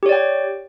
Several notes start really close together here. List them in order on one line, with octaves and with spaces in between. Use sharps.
G4 C#5 D5 G5